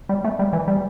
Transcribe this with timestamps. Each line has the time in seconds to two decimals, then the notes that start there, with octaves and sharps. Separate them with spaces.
0.09 G3
0.24 A3
0.39 G3
0.53 E3
0.68 G3